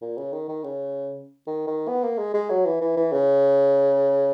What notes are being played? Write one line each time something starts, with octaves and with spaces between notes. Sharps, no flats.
A#2
C#3
D#3
D#3
C#3
D#3
D#3
B3
A#3
G#3
G#3
F#3
E3
E3
E3
C#3